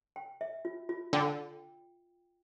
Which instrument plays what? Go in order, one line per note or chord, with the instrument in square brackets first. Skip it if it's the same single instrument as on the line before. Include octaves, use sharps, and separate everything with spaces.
[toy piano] G5
E5
F4
F4
[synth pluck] D3 [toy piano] G5